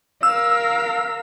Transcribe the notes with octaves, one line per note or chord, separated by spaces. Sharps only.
A#4 F5 E6